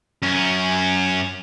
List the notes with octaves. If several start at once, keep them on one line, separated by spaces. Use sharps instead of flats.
F#2 C#4